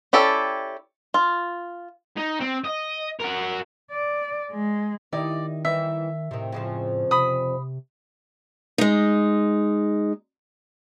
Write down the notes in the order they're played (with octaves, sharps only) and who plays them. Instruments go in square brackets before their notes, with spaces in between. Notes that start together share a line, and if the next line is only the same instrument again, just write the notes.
[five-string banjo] C#4 E4 G4 A4 D5
F4
[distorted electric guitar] D#4
C4
D#5
F#4 A#4
[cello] D5
G#3
[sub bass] D#3 [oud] D#4 E4 G4 [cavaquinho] D5
[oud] E3 G3 D#4 [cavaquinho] E5
[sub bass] A2 [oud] C3 D#3
[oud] F2 C#3 F3
[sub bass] C3 [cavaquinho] B5 D#6
[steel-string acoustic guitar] G#3 D#4